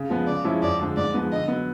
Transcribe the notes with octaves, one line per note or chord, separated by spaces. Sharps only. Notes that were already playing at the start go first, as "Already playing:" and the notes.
Already playing: C#3
F3 G#3 B3
C#3 D5
F3 G#3 C#4 E4
F2 D5
D3 F3 G#3
G#2 D5
F3 G#3 B3
D3 D#5
F#3 B3